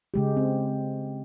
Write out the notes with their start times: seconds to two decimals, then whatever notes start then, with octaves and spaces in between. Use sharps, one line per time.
0.14 C#3 G#3 G4
0.37 C4